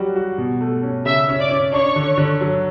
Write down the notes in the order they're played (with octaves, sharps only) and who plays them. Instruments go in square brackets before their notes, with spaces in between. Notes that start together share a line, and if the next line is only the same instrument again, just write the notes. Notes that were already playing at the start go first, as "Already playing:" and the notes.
Already playing: [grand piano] F#3 G3 F#4
F#4
B2
A3
C#4
[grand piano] C#3 [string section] E5 E6
[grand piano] C#4
[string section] D5 D6
[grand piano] C#4
[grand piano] D4 [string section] C#5 C#6
[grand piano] D3
D3
F#3